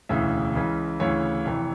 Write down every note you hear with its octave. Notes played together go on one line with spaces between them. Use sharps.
E1 D2 C#3 E3 E5
C#2 C#3 E3
D2 C#3 E3 C#5
F1 F2 E3